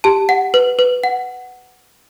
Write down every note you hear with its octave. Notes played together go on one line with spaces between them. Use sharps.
G4 A5
F#5
B4
B4
F#5